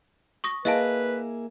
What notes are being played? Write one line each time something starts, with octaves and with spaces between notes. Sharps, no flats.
C#6 D#6 A#6
A#3 E4 G#4 B4 D#5 F5 A5